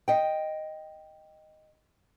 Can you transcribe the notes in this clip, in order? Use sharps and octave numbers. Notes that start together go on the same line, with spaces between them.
D#5 G5